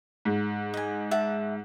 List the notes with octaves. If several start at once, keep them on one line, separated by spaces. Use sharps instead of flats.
G#2
D#5 G#5
E5 F#5 A5